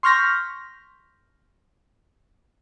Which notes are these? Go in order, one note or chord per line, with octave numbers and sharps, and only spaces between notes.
C6 C#6 F6 G6 A#6 B6